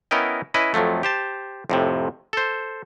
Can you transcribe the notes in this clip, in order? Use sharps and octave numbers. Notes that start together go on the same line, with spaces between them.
B3 C#4 E4 A#4 D#5 G5
C#4 E4 B4 D#5
F2 F3 F#3 A3
G4 C5 A5
F2 A2 C3
A4 C5